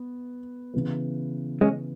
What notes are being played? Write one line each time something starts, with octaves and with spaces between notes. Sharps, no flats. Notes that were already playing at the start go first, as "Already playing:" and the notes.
Already playing: B3
C#3 E3 B3
G#3 C#4